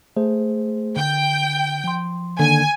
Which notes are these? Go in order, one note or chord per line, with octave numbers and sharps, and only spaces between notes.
A3 G#4 C5
D3 G5
F3 C6
D3 D#3 A#3 G#5